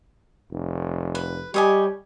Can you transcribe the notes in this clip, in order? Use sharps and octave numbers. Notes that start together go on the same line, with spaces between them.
F1
B4
G3 G4 C#5 D#5 G#5